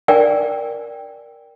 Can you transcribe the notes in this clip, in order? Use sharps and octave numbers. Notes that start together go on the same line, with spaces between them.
A#4 D5 G5 G#5